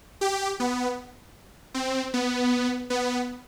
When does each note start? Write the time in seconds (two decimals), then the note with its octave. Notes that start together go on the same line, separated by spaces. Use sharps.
0.21 G4
0.60 B3
1.74 C4
2.14 B3
2.90 B3